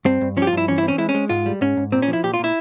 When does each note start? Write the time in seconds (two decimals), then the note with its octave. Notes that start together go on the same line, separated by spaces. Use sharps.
0.05 G2 C4
0.21 G2
0.37 F3 C#4
0.42 G4
0.47 F4
0.53 G2 E4
0.68 E3 C#4
0.78 E4
0.83 C4
0.88 C#4
0.98 G#3 E4
1.09 C#4
1.15 G#3
1.29 G#2 F4
1.46 G3
1.61 G#2 C#4
1.77 G#2
1.92 A#2 C4
2.02 C#4
2.08 F3
2.13 E4
2.23 A#2 G4
2.34 F4
2.39 A#2 E4